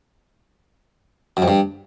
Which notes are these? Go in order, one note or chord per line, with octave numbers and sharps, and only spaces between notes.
F#2
F2
G2